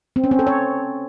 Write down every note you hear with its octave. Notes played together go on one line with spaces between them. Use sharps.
C4
C#4
C4
A4
C#5